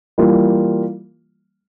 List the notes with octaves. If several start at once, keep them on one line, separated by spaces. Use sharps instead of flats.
E3 G3 A#3 F4